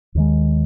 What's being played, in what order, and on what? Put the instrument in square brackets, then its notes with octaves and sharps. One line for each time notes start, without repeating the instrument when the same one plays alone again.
[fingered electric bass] D#2 D#3 G#3